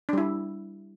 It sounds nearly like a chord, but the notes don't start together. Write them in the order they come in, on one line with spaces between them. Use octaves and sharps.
D4 G3 E4